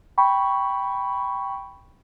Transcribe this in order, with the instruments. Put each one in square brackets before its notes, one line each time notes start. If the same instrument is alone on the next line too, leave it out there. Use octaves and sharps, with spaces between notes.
[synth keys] G5 B5 C#6